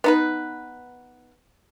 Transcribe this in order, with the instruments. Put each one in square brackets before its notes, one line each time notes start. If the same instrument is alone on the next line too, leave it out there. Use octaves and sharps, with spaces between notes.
[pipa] B3 D#4 B4